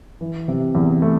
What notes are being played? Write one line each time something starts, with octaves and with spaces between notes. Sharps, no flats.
E3
C3
E2
A3